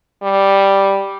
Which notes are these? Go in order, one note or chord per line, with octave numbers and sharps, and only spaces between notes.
G3